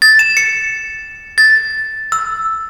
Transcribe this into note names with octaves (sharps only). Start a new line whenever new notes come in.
A6
E7
C#7
A6
E6